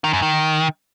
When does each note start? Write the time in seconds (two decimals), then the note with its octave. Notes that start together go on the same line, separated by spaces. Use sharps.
0.04 D#3
0.13 F#2
0.22 D#3